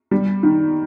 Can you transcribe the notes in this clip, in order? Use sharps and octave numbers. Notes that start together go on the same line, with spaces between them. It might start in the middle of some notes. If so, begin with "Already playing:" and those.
G3
D#3